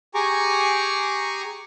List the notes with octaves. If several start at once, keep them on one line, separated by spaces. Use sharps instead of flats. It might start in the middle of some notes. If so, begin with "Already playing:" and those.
G4 G#4 G#5 A#5 C#6 D6